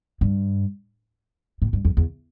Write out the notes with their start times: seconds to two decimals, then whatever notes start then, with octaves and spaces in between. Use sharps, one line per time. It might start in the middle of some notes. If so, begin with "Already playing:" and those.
0.21 G2
1.62 A2
1.73 G2
1.85 F2
1.97 E2